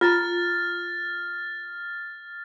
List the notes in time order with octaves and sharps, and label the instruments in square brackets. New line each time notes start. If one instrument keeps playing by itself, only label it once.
[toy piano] F4 A#5 [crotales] F6 A6